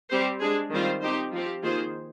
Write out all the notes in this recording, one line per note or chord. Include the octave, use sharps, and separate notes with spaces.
G3 C4 G4 C5
G#3 D4 G#4
D#3 G3 C4 F4 C5
C4 D#4 G4 C5
F3 C4 G4
D#3 A#3 F4 G#4 C5